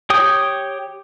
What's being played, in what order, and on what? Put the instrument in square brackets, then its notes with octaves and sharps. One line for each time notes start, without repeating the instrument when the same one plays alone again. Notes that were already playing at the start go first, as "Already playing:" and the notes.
[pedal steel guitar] G4 C#5 G5 D#6